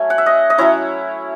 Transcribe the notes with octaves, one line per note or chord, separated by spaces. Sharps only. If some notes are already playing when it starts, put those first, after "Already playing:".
Already playing: F#3 A3 C#4 G#5
F#5
E5
D#5
D#5
F#3 C#4 E4 C#5